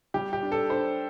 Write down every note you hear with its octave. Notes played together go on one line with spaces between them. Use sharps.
G3 G4
G4
D4
A4
D4 C5